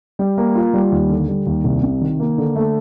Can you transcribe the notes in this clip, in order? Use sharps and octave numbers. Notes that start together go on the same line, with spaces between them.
G3
A#3
F4
G3
D#2
D3
G3
D#2
C2
C3
D#3
A#3
D3
A3